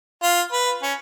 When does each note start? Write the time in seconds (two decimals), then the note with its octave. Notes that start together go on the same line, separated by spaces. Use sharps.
0.23 F4
0.53 B4
0.83 C#4